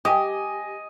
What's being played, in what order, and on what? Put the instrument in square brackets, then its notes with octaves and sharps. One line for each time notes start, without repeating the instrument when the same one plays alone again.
[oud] G4 [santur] D#5 G#5